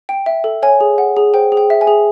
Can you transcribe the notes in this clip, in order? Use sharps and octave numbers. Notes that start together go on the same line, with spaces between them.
G5
E5
A4
C#5 G#5
G#4
F#5
G#4
C5 G5
G#4
G5
E5
G#5
G#4